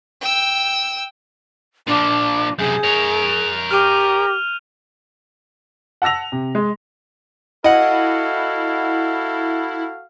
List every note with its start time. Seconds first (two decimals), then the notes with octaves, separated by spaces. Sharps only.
0.21 G5 E6
1.87 A#2 F3 D4
2.59 F#2 C3 G#4 G6
2.83 A#4 C#5 F7
3.71 G4 F6 D#7
6.02 F#5 A5 E6 A#6 F7
6.32 C3
6.55 G#3
7.64 E4 F#4 A4 D#5 F5 F#5